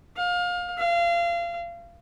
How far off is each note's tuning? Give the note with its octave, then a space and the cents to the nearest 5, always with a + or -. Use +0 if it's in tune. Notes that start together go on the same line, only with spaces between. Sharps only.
F5 +25
F5 -30